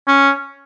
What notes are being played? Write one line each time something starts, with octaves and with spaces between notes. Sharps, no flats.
C#4